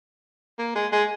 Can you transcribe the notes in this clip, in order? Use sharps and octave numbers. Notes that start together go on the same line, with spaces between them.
A#3
G#3
G#3